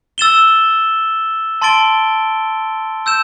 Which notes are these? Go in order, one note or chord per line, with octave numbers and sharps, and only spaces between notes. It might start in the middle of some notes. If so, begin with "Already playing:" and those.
E6 A6 E7 G7
A5 C6 A6 D7 G7
E6 G6 E7